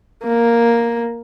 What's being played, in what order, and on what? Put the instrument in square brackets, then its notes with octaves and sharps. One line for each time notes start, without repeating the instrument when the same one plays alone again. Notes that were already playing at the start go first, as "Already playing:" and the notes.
[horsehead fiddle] A#3